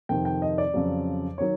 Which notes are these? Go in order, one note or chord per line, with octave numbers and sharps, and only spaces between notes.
F2 C3 D#3 G5
G5
D#5
D5
F2 C#3 F#3
D#3 F#3 C#5